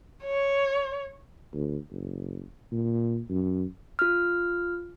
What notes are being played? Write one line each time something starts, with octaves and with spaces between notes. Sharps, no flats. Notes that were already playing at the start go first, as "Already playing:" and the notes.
C#5
D2
F#1
A#2
F#2
F4 F6